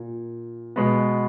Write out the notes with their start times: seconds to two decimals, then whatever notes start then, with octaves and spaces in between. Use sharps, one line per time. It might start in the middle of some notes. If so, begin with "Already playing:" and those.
Already playing: A#2
0.76 B2 G#3 B3